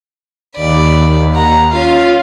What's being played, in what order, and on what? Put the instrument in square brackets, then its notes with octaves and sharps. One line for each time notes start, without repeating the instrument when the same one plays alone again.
[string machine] D#2 [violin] D5 B5
[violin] F#5 A#5
[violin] C#4 F5 [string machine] F4